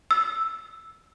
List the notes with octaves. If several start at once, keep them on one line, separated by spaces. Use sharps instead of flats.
E6